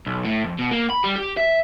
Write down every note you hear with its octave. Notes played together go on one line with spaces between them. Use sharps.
B1
A2
F2
B2
A#3
B5
G3
G4
E5